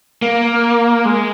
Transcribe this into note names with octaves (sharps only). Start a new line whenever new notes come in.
A#3
G#3